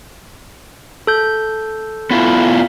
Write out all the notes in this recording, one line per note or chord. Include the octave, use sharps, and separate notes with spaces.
A4 G6
B3 E4 F4